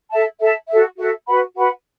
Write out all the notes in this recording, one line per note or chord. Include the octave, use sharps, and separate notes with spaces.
A4 E5 A5
A4 E5 A5
F#4 A4 E5
F#4 A4 E5
F#4 B4 F#5 B5
F#4 B4 F#5 B5